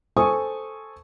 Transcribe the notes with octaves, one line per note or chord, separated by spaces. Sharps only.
A4 C5 G#5 C#6 D#6